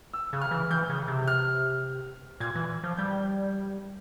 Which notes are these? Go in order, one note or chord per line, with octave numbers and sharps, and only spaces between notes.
E6
C#3
F6
E3
E3 G6
C#3
C3
F6
A#2 G#6
E3
F3
G3 G6